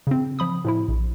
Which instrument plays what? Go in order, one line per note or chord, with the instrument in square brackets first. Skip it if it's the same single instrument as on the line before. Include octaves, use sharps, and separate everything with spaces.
[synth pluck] C#3 C4
F3 B5 D#6
A2 F3 E4
A#1